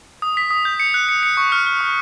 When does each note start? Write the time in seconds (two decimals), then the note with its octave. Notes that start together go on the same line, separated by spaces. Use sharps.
0.22 D#6
0.37 B6
0.50 D#6
0.65 G6
0.80 C#7
0.94 F#6
1.09 C#7
1.23 C#7
1.37 C#6
1.52 F6
1.67 F6
1.81 C#6